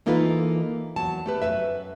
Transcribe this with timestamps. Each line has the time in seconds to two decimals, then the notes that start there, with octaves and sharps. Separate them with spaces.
0.06 E3 A#3 D#4 F4 A4 B4
0.96 E2 F#3 A5
1.26 A3 G4 B4
1.42 F#2 E3 B4 E5